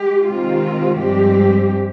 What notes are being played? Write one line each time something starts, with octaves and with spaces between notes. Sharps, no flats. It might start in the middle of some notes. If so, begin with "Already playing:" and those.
Already playing: G#3 G4
C3 D#3 G#3 C4 F4
G2 F3 G#3 C4 G4